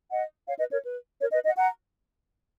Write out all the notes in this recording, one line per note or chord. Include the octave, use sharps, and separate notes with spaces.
D#5 F#5
C#5 F5
B4 D#5
A#4 C#5
B4
A#4 C#5
B4 D#5
D#5 F#5
F#5 A#5